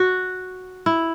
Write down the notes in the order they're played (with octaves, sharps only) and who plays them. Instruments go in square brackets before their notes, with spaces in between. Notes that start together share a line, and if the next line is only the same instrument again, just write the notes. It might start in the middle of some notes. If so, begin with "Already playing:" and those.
Already playing: [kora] F#4
E4